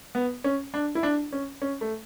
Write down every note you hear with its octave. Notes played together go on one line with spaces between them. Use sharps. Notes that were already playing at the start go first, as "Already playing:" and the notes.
B3
C#4
D4
E4
D4
C#4
C#4
A3